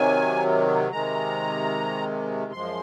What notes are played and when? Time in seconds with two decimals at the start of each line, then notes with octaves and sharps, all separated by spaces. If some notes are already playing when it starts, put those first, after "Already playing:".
Already playing: C3 D#3 F#3 G#5
0.92 C3 D#3 G#3 A#5
2.52 F#2 F3 G#3 C6